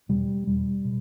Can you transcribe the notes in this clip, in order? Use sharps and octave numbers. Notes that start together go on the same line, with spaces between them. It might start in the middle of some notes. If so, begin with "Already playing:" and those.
E2 B2 G3
E2 B2 G3
B2